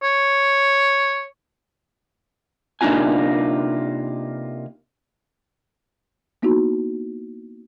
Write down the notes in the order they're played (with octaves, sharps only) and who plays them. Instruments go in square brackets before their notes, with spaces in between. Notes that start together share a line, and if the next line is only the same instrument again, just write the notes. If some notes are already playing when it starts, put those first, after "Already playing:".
[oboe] C#5
[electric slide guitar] C3 A#3 D4 D#4 F4 G#5
[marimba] A#3 B3 D#4 E4 F#4